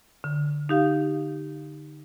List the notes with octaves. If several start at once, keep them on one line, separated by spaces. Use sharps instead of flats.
D3
D#4 G4 F5